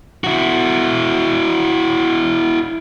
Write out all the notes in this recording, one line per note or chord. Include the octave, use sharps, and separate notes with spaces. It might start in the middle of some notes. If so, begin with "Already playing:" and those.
E4 F#4